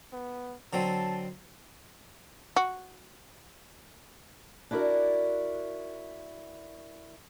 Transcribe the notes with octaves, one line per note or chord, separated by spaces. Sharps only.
B3
D3 F#3 C4 A5
F#4
D4 E4 F#4 G4 A#4 D5